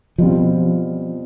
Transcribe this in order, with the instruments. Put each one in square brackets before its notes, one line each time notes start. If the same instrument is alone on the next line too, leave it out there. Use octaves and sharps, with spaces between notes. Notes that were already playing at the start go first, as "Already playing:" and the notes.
[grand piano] B2 G3 C4 F4 [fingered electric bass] F3